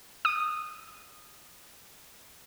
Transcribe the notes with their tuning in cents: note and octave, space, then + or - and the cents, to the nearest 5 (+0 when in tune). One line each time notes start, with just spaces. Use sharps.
D#6 -15